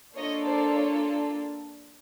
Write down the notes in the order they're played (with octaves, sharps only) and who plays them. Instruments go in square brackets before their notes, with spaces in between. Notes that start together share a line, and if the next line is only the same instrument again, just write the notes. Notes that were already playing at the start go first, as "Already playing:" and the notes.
[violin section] A#3 D4 F4 A4 C#5 D#5
C5 D5
C#5